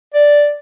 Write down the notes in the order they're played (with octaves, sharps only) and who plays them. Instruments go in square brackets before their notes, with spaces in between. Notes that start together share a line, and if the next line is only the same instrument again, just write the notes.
[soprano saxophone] D5